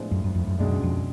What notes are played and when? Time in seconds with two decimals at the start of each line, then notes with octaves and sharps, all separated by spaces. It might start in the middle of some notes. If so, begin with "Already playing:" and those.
Already playing: A2 F3 G#3 B3 D4
0.11 F#2
0.24 F#2
0.35 F2
0.47 F#2
0.59 C#2 F#2 B2 G#3 D4
0.83 F2